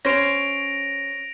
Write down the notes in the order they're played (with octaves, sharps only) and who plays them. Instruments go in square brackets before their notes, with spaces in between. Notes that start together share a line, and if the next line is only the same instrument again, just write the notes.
[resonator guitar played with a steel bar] C#4 C5 [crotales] A#6 D7 F7